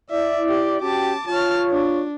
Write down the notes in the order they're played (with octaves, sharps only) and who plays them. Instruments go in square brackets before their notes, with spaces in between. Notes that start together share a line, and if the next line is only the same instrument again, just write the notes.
[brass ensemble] E4 D5 [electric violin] E5
[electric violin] G4
[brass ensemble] C#4 F#4 G4 [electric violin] A5 D6
[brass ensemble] F4 C#5 [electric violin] A5 F6
[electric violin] D4